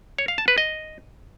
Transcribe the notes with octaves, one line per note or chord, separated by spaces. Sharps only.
C#5
F5
A5
B4
D#5